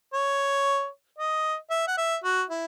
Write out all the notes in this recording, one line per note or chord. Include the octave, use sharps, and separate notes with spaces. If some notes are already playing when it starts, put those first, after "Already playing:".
C#5
D#5
E5
F#5
E5
F#4
E4